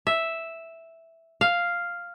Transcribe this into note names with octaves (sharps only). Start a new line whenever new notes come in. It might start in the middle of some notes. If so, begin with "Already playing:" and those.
E5
F5